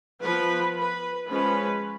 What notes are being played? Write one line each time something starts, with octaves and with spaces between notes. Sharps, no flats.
F3 B3 B4
B4
F3 G#3 C#4 B4